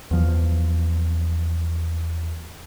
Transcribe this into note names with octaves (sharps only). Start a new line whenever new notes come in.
E2 F3